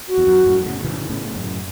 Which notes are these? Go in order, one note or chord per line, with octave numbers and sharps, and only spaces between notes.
F#4
E2
F#2
F#2 A2
A2 C#3
C#3 E3
A2 C#3
F#2